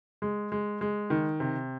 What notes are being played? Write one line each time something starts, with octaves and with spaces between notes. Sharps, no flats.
G#3
G#3
G#3
D#3
C3